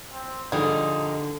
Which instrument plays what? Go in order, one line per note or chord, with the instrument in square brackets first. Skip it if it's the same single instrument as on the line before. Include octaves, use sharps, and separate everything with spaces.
[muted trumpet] C4
[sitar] A#2 F3 D#4 [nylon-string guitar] D3 [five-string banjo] G3 G#4 [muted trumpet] D#5